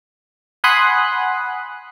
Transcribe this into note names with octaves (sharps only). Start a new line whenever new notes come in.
F#5 G#5 B5 C6 D#6 F#6